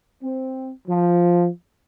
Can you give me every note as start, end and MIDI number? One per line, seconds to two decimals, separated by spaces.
0.23 0.71 60
0.87 1.48 53